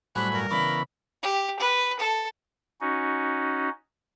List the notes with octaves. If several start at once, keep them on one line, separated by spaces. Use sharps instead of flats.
A2 F#3 G3 C4 D4 G#5 B5 F#6
G2 A#4
C#3 E3 B3 C#4 D4 B5 D6
G4
B4
A4
C#4 D#4 F#4